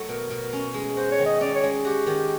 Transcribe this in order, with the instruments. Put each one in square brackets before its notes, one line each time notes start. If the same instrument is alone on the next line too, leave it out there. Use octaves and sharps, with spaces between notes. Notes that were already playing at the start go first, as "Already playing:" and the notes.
Already playing: [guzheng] F#3 A3
[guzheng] B2 [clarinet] A#4
[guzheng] B2
C#4
G#3
[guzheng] F#4 [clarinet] C5
[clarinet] C#5
[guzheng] D#3
[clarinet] D#5
[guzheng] C#4 [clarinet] D5
[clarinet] C#5
[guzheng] G#3
[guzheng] F#4 [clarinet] G4
[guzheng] D#3